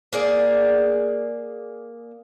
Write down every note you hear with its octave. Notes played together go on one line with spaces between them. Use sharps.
A#3 G#4 D5